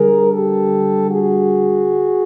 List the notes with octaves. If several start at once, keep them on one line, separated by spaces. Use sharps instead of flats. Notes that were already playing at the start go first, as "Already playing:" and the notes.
Already playing: D3 G3 G#4 A#4
G4 A4
F#4 G#4